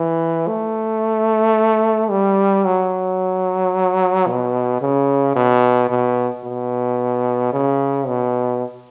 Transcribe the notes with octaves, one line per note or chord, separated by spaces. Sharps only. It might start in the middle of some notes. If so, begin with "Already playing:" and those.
Already playing: E3
A3
G3
F#3
B2
C#3
B2
B2
B2
C#3
B2